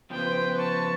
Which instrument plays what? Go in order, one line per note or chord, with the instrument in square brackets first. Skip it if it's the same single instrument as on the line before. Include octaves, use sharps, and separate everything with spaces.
[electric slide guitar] C#3 F3 B3 [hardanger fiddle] B4 C5 [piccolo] G5
[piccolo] A5 [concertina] C#6